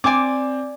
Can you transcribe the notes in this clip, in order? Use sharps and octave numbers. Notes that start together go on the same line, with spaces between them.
C4 D5 G#5 D6